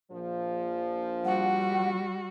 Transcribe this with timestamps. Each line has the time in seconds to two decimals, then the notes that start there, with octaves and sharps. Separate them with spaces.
0.11 A#1 F3
1.25 G3 F#4 F#5